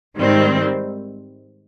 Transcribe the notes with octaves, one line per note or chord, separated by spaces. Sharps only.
G#2 D#3 G3 C4